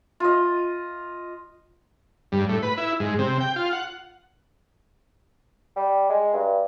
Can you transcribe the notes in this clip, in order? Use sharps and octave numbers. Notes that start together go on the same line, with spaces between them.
F4 D#5
G2
A2
B4
E4
G#2
C3
G5
F4
F#5
G3
G#3
G2